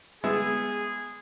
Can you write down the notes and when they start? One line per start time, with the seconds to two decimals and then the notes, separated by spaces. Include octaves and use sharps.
0.24 G#3 B3 G#4 E5